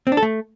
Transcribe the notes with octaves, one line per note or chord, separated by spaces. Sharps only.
C4
D4
A4
A3